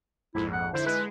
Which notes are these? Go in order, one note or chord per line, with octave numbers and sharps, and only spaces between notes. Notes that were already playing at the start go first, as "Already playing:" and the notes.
A#1 F2 G#2 E4
F#5
D3 E4 C5
G#3 B4